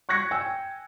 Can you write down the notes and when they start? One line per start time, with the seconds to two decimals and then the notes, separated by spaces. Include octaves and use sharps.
0.09 C#6 F#6 G#6 A#6 C#7
0.31 G5 G#5 E6